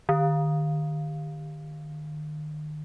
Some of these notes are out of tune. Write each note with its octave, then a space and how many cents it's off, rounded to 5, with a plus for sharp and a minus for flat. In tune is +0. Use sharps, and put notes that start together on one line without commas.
D#3 -40